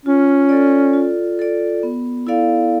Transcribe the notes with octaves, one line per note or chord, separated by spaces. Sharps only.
C#4 F4
A4 D5
F4
A4 D5
B3
E4 A4 D5 F5